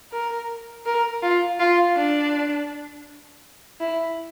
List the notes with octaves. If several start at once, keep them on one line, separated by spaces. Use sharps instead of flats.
A#4
A#4
F4
F4
D4
E4